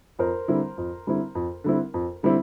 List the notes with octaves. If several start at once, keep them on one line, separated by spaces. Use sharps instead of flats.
F2 A#4 C5
D3 G3 C4 E4
F2
D3 G3 C4 E4
F2
D3 G3 C4 E4
F2
D3 G3 C4 E4